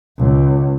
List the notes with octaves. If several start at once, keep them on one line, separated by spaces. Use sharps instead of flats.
C#2